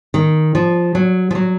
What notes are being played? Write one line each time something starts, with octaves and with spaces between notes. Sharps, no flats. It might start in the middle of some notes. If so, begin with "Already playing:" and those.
D#3
F3
F#3
F3
F#3